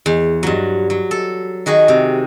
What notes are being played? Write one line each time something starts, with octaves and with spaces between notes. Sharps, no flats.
E2
G2 F#3
F#3
A4
D#3 F#4 G#4
C3